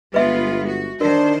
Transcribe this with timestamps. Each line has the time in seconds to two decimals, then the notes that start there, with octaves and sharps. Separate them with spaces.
0.14 G1 G#3 B3 F4 B4 E5
0.67 F#4
1.01 D#3 D4 A#4 C5